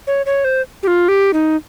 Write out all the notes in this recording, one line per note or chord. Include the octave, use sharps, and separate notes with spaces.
C#5
C#5
C5
G4
F4
G4
D#4